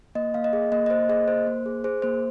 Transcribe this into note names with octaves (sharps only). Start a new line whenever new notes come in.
A#3 D#5
A#3 F5
D#5
G#4
A#3 D#5
D#5
A#3 C5
G#4 D#5
A#3 C5
A#3
G#4
G#4 C5
A#3 C5